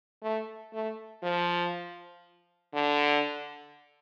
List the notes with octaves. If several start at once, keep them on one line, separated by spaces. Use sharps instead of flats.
A3
A3
F3
D3